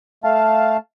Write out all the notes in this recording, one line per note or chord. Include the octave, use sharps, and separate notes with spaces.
A3 F5 A5